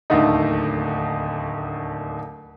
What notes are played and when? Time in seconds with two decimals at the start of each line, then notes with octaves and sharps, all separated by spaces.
0.10 D1 D#2 D3 A3 D#4